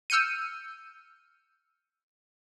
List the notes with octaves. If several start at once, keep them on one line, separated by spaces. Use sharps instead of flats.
E6 F6 G6 C#7 D#7